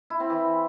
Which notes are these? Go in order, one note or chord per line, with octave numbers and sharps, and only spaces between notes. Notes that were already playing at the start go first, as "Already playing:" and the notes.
E4
C4
E3